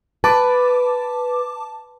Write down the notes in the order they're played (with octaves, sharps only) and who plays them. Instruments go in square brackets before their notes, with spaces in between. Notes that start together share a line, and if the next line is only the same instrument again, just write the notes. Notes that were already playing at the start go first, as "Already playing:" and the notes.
[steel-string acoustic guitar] B4 [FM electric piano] A5 D6